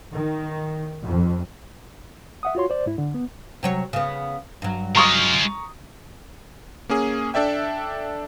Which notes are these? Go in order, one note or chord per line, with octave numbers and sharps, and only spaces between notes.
D#3
F2
E5 F#5 D#6
F4 F#4 C#5 C6
C5 D5
G#2 E4
D3
B3
C3 F#3 C#5
C#3 B3
G2 F#3
G#3 F4 A#5 C#6 D#6
A#3 C#4 G#4
D4 A4 D5 E5 G5